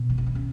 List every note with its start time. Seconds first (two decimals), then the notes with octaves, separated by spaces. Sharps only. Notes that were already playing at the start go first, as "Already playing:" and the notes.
Already playing: B2
0.10 E3
0.18 D#3
0.26 D3
0.35 C#3